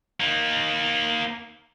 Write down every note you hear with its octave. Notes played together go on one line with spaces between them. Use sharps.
A#3 D#4